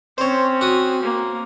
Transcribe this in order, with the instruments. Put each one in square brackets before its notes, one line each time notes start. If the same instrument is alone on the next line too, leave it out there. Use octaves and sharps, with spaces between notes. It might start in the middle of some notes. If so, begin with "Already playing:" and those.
[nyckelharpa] C4 C#4 [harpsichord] C5 C#5
[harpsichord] F#4 D#6
[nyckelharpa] A#3